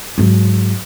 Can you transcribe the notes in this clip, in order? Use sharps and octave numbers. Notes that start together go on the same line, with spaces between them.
G#2 F#3